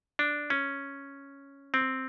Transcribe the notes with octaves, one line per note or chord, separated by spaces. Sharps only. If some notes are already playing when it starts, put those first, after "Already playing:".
D4
C#4
C4